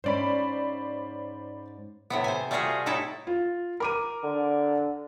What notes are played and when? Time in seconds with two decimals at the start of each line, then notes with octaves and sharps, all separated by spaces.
0.04 G#2 C#4 C5 D5 B5
2.10 A2 C3 B3
2.24 C5 G#5
2.51 G3 A3 F4 F#4 G#4 F5
2.86 A2 D#4 E4 A4
3.27 F4
3.80 A#4 D6 D#7
4.24 D3